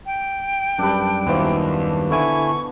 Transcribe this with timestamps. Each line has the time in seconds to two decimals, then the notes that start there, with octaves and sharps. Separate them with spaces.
0.06 G5
0.79 F#2 G3 D4 A4 B4
1.27 D#2 B2 E3 F3
2.11 D3 E4 G#5 C#6